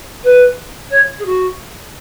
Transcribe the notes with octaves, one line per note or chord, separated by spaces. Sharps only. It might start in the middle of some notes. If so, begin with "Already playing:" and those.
B4
C#5
G#4
F#4